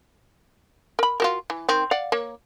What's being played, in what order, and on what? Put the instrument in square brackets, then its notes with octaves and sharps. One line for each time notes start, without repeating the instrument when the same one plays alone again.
[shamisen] A#4 B5
F4 F#4 A#4
E3
D#3 C4
D5 F5 F#5
A#3 C#5